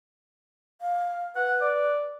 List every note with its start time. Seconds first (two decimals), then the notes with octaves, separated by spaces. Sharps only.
0.81 F5
1.35 B4 F#5
1.61 D5